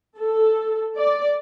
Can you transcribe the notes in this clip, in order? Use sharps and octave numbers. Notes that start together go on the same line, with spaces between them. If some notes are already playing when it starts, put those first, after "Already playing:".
A4
D5